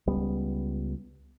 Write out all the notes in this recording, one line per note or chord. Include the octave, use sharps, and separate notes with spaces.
C#2 G3 B3